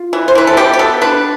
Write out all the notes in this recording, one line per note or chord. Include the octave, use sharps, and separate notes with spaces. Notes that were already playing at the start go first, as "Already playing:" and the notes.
Already playing: F4
E3
C5
E3 B4
A4
B2 G4
G4
B3 A4
D4 B4